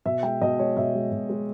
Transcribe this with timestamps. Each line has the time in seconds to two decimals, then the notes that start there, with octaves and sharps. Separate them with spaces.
0.05 B2 E5
0.23 G#3 G5
0.41 B2 D#5
0.59 G#3 C#5
0.77 B2 E5
0.94 G#3
1.11 B2
1.29 G#3